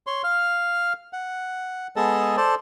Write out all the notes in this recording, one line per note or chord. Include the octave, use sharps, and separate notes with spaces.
C#5 C6
F5 F6
F#5
G#3 B3 G#4 A4 D#5 A5
A4 C5 D5 A5